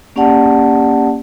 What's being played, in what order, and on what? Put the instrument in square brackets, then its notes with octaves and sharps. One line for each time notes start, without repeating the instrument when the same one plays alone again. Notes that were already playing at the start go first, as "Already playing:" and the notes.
[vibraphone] A#3 C#4 G4 D5 F#5 A5